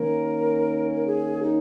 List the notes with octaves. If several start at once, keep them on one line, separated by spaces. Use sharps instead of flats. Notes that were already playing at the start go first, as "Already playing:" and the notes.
Already playing: D#3 A#3 C#4 A#4
G#4
D#4